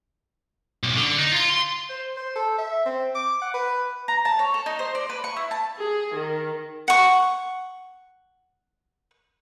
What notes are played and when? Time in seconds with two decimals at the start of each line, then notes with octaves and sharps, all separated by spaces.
0.83 B1
0.98 D3
1.19 D#4
1.33 F4
1.50 C6
1.90 C5
2.17 C5
2.36 A4
2.58 E5
2.86 C4
3.15 D6
3.42 F#5
3.54 B4
4.08 A#5
4.25 A5
4.39 C#5
4.54 A4
4.66 D#4
4.79 C5
4.95 D5
5.10 B4
5.24 C#6
5.37 E4
5.51 A5
5.78 G#4
6.14 D#3
6.88 F#5 C#6